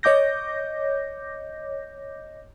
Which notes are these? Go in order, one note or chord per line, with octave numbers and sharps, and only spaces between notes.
C#5 D#5 D6 G6 A#6